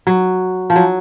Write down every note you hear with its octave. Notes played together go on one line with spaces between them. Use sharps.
F#3
F3
F#3